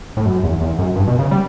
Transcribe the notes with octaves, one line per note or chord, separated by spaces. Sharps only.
A2
F#2
E2
E2
F#2
G2
B2
C#3
G3